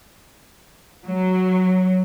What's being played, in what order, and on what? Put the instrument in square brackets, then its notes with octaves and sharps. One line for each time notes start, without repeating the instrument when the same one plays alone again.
[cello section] F#3